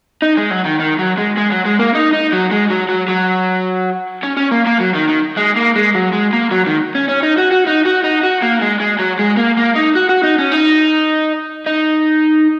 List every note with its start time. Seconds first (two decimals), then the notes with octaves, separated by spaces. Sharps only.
0.22 D#4
0.37 G#3
0.51 F#3
0.65 D#3
0.80 D#3
0.99 F#3
1.18 G#3
1.37 G#3
1.51 F#3
1.65 G#3
1.79 A#3
1.95 D#4
2.13 D#4
2.32 F#3
2.51 G#3
2.70 F#3
2.89 F#3
3.08 F#3
4.23 C#4
4.37 C#4
4.51 A#3
4.66 A#3
4.80 F#3
4.94 D#3
5.09 D#3
5.37 G#3
5.56 A#3
5.76 G#3
5.95 F#3
6.13 G#3
6.33 A#3
6.51 F#3
6.67 D#3
6.95 C#4
7.09 C#4
7.23 D#4
7.38 F#4
7.51 F#4
7.67 D#4
7.85 F#4
8.04 D#4
8.23 F#4
8.42 A#3
8.62 G#3
8.80 G#3
8.99 F#3
9.19 G#3
9.37 A#3
9.57 A#3
9.75 D#4
9.95 F#4
10.09 F#4
10.23 D#4
10.38 C#4
10.52 D#4
11.66 D#4